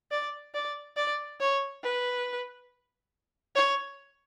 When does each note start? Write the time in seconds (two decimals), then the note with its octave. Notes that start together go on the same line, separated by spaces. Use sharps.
0.11 D5
0.54 D5
0.97 D5
1.41 C#5
1.84 B4
3.56 C#5